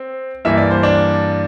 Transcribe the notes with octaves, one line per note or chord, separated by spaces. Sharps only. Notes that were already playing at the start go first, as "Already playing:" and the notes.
Already playing: C4
G2 E3 A#3 E5
D5
C5
D4 D5